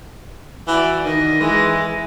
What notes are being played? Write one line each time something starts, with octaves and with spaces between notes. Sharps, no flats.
E3 F#4 D5
D#3 D#5
E3 G#3 D#5